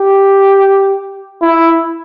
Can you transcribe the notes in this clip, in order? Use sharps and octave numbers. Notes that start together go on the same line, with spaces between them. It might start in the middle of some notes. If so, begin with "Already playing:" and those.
Already playing: G4
E4